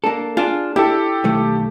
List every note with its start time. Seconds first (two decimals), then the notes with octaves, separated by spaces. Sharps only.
0.04 A#3 D4 A4
0.37 D4 F4 G#4
0.76 E4 G4 A4
1.24 B1 D#3 A3